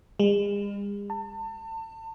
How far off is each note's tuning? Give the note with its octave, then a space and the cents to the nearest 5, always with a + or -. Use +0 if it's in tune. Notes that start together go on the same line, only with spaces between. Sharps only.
G#3 -45
A5 +35